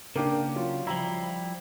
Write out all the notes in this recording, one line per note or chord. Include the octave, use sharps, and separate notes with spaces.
C#3 A#3 D4 G4
F#3 F4
F3 G3 E4 A#5